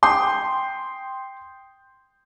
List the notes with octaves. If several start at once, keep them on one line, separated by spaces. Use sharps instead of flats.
G5 C6 D#6 G6